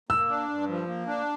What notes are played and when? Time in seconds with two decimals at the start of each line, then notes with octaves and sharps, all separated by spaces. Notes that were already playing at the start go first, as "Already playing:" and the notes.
0.09 A#3 E6
0.29 D4
0.49 G2
0.68 F3
0.86 A#3
1.06 D4